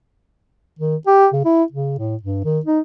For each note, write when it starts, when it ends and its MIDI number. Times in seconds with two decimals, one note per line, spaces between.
0.79 0.96 51
1.07 1.27 67
1.33 1.41 49
1.45 1.63 64
1.72 1.95 49
1.99 2.16 45
2.23 2.41 43
2.44 2.60 51
2.65 2.80 63